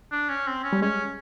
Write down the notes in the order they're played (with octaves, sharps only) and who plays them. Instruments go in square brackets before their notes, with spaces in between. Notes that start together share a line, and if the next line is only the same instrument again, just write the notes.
[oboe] D4
C#4
C4
C#4
[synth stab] G3
[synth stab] G#3 [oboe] C#4